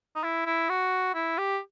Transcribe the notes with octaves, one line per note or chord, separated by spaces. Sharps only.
D#4
E4
E4
F#4
E4
G4